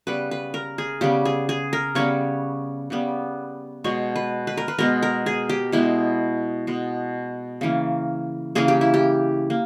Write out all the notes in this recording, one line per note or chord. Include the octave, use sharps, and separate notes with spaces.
C#3 G3 B3 B4
B4
A#4
G#4
C#3 G3 B3 G4
G#4
G#4
A#4
C#3 G3 B3 C#5
C#3 G3 B3
B2 G#3 B3 C#5
B4
B4
A#4
B4
B2 G#3 B3 A#4
A#4
G#4
G4
B2 G#3 B3 E4
B2 G#3 B3
C#3 E3 A#3
C#3 E3 A#3 G#4
G4
E4
G4
A#3